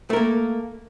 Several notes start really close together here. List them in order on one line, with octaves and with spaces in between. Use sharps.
A3 A#4 A#3